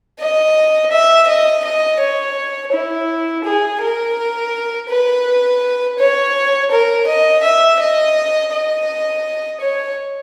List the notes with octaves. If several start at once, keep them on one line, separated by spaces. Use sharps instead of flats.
D#5
E5
D#5
D#5
C#5
E4
G#4
A#4
B4
C#5
A#4
D#5
E5
D#5
D#5
C#5